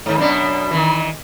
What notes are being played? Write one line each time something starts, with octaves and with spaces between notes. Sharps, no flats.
G#2 D#3
F#2 B2 D4
D#3 E3